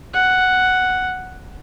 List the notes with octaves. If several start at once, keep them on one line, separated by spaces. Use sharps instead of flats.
F#5